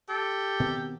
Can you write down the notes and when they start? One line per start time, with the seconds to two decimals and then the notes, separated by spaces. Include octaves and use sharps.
0.09 G4 A4
0.60 B2 D#3 C4